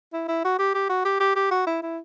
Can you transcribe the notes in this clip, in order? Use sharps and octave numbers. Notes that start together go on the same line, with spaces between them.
E4
E4
F#4
G4
G4
F#4
G4
G4
G4
F#4
E4
E4